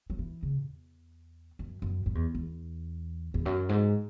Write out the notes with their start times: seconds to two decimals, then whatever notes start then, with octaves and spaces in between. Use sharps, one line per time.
0.10 F#3
0.19 E3
0.43 C#3
0.66 E2
1.59 F#2
1.82 F#2
2.06 F#2
2.15 E2
2.35 E2
3.34 E2
3.46 F#2
3.69 G#2